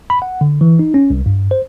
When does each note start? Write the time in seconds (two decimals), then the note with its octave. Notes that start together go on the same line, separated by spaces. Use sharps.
0.10 B5
0.22 F#5
0.41 D3
0.61 E3
0.79 D#4
0.94 C#4
1.10 C2
1.26 G2
1.51 C5